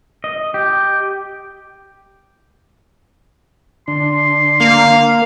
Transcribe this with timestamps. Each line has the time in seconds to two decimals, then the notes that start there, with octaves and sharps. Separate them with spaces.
0.24 D#5
0.54 G4
3.88 D3 D4 C6
4.60 A#3 F5